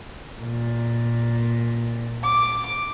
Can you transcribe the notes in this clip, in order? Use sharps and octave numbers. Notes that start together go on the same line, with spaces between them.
A#2
D6